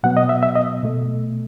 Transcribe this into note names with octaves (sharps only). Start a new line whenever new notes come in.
B2 F#3 B3 F#5
D#5
E5
E5
D#5
B2 A3